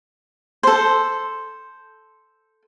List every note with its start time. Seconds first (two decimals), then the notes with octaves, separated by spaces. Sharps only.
0.63 A4 C5